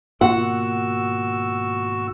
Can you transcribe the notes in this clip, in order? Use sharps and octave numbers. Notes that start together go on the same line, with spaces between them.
G#1 B2 A#3 F4 F#4 F#5 E6